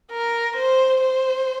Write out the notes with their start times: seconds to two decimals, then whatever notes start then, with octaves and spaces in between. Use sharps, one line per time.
0.12 A#4
0.57 C5
1.01 C5